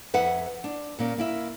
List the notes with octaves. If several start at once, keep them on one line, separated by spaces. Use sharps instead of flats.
F2 B4 E5 F#5
D4
A#2 A#3 C#4
A#3 E4 E5